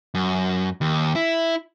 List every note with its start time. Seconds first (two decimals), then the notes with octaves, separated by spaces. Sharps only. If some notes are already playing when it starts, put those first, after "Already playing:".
0.15 F#2
0.81 D#2
1.15 E4